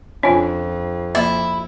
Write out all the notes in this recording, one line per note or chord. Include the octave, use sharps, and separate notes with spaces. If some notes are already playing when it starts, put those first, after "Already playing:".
F2 C#4 D4 F4
F3 A#3 E4